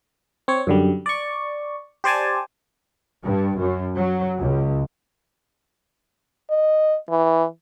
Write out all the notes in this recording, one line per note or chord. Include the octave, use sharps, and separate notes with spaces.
C4 C#5
F#2 D3 G3
D5 C#6
G4 C5 D5 G#5 A5
G2
F#2
F#3
C#2
D#5
E3